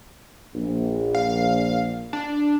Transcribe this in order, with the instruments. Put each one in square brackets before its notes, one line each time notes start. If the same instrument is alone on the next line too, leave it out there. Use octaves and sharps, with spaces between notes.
[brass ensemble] A#1
[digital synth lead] F5
D4